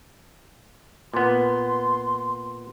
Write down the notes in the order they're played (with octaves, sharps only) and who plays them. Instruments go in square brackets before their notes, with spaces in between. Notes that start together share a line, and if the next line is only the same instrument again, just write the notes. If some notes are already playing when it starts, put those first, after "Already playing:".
[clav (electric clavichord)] A#2 B3 [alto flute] C6